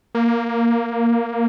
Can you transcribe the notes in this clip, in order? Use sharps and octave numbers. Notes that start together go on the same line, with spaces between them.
A#3